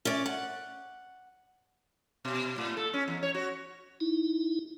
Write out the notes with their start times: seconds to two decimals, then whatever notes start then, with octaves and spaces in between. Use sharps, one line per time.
0.05 C#4 D5
0.26 F#5
2.25 B2
2.58 A2
2.77 A4
2.94 C#4
3.08 E2
3.23 C#5
3.34 F#4
4.00 D#4 E4